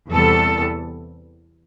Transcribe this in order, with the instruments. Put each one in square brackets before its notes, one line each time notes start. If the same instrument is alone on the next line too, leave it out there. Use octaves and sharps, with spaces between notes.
[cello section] E2 C3 E3 G3 B3 A4